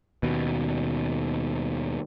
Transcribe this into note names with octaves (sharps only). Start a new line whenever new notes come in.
D#2 B2